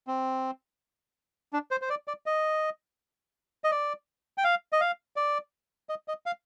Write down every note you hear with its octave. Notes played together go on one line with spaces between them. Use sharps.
C4
D4
C5
C5
D5
D5
D#5
D#5
D5
G5
F5
D#5
F5
D5
D#5
D#5
F5